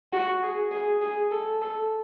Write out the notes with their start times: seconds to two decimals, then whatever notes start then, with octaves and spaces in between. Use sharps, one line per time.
0.13 F#4
0.43 G#4
0.72 G#4
1.02 G#4
1.31 A4
1.62 A4